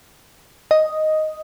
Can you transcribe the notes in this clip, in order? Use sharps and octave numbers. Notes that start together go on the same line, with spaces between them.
D#5